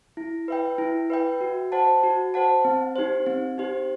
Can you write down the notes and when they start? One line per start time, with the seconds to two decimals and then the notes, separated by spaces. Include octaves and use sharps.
0.17 E4
0.48 B4 E5 G5
0.78 E4
1.10 B4 E5 G5
1.41 F#4
1.72 C5 F#5 A5
2.03 F#4
2.34 C5 F#5 A5
2.65 C4
2.96 D#4 G4 C5
3.26 C4
3.58 D#4 G4 C5